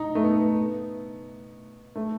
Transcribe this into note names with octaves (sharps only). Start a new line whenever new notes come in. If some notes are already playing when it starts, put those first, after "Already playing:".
Already playing: D#4
A3
B3
A3